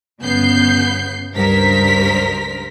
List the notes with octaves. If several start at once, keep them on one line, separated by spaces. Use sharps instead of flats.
G1 C#3 B3 G6 C7
C#2 G2 A#4 C5 B6